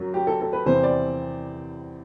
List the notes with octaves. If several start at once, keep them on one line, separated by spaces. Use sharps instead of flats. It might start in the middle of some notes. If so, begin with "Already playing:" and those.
Already playing: F#2 F#3
G4
A4
A4
B4
E2 C3 E3 G3 C5
D5